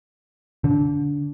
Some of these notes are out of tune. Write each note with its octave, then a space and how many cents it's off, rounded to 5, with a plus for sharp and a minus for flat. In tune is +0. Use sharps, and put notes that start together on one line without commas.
D3 -20